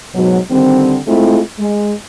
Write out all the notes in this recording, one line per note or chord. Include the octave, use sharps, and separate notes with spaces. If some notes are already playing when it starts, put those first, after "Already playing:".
G#2 B2 F#3
D3 D#3 G3 C4
G#3 A3 C4 E4 F4
G#3